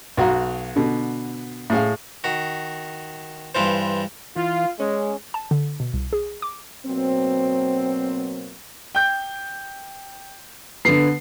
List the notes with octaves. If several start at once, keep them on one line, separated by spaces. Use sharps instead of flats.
B1 F#4 F5 A#5
B2 D3
A2 G#4 F5
D#3 F#4
G2 E3 F4 C5
E3 F4
G#3 C#4
A5
D3
B2
C2
G#4
D6
B2 F#3 A#3 C4
G5 G6
D3 B3 C7